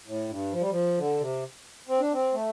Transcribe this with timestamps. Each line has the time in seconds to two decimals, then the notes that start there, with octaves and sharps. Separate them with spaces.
0.07 A2
0.29 G2
0.53 F3
0.61 G3
0.71 F3
0.98 D3
1.20 C3
1.88 C4
2.00 D4
2.13 C4
2.34 A3